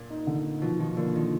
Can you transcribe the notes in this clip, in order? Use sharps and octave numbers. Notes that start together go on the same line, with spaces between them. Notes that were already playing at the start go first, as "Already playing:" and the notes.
Already playing: A#2
D#4
D3
D#4
B2 F3
D#3 F3
D3 A#3
D#3 F3